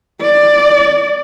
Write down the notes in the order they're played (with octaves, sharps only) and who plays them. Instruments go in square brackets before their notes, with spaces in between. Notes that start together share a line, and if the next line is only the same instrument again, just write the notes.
[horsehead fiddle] D5